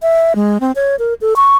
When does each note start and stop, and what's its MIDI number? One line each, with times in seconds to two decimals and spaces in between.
0.02 0.33 76
0.35 0.58 56
0.60 0.72 60
0.76 0.96 73
0.99 1.14 70
1.21 1.34 69
1.36 1.57 85